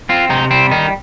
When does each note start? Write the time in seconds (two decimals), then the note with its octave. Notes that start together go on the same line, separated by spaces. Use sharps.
0.09 C4 F4
0.30 C3 D#4
0.51 G3 C4
0.71 D#3 D#4